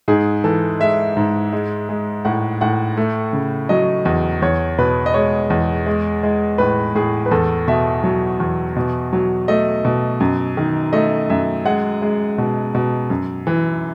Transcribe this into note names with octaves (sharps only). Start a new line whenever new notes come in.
G#2 G#4
E3 A4
G#3 E5
G#2
G#3
G#3
A2 F#5
A2 F#5
A3
C#3
F#3 D#5
E2
E2 C#5
B2 B4
D#5
G#3 C#5
E2
G#3
G#3
A2 B4
A2 G#4
B4
E2 A4
B2 E5
F#3
E2
B2
F#3
A3 D#5
B2
F#2
D#3
A3 D#5
F#2 E5
G#3 F#5
G#3
B2
B2
F#2
E3